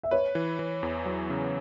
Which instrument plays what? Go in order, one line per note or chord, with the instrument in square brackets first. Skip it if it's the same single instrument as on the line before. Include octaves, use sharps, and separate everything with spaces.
[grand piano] E5
[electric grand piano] B4 [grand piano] C#5
[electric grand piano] E3
E3
E2
F#3
C#3